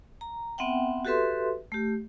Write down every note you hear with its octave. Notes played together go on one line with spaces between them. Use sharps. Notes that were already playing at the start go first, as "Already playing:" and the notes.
A#5
B3 C4 E5 F#5 G5
F#4 G4 A4 B4 E5 C6
A3 G4